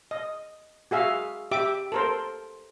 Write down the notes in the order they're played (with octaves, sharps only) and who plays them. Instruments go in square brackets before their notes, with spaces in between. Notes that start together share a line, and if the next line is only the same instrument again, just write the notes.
[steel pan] D#5
F#4 G#4 E5 F5
G4 E5 D6
A4 A#4 C5